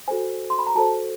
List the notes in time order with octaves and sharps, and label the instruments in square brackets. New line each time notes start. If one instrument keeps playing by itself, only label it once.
[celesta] F#4 A4 C5 G#5
C6
B5
A#5
F#4 A4 C5 A5